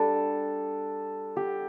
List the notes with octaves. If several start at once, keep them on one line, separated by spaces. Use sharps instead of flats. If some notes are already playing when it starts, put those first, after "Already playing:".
Already playing: G3 D4 A4
G4